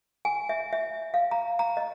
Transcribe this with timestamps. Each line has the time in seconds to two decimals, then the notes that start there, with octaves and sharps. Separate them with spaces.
0.25 G#5
0.49 E5
0.73 E5
1.14 F5
1.31 A#5
1.59 A#5
1.77 D#5